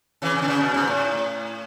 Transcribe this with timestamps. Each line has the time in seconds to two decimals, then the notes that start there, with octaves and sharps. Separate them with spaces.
0.22 C#3 E3
0.35 C#3
0.42 D3
0.48 C#3
0.61 B2
0.74 G#2
0.87 A2